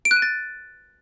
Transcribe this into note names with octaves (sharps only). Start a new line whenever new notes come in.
D7
F#6
D#7
A6